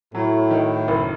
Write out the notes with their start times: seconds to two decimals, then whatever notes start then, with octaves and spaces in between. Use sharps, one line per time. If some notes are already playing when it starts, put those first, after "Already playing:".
0.14 A2 F#3
0.51 D#3
0.88 F#1